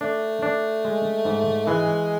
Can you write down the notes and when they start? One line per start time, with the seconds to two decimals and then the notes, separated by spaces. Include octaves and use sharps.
0.01 A3 D4
0.42 D4
0.85 G#3
1.25 G#2
1.67 E3 G#3